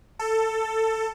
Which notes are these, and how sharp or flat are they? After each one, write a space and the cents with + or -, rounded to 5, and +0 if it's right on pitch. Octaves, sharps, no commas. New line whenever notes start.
A4 +15